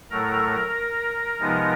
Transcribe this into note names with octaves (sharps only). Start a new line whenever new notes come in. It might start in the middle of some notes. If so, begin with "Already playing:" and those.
A2 F#3 A3 A#4 A#5
C3 F3 G#3 B3 D#4